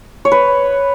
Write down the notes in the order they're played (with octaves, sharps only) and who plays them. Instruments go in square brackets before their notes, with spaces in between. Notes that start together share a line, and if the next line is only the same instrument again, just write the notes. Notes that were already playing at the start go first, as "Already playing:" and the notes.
[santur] C#5
B4